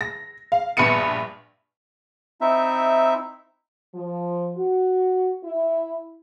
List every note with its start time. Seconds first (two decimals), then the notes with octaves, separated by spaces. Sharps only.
0.01 A#6
0.52 F5
0.77 A#1 G2 B3 C#7 D#7
2.41 C4 D#4 E4 E5
3.95 F3
4.56 F#4
5.44 E4